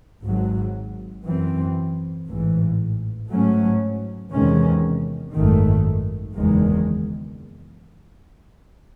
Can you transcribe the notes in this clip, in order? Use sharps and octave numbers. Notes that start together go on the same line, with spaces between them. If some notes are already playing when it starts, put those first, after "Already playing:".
G#1 G#2 F#3
F#2 E3 C4
A1 G#2 E3
G#2 F#3 A3 C#4
E2 C3 D#3 G#3 C#4
G#1 F#2 D#3 A3
F#1 E2 D#3 G#3